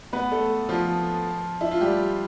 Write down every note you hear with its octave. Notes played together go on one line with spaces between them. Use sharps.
B3 B4
A3 A4
F3 F4
E4
F4
G3 G4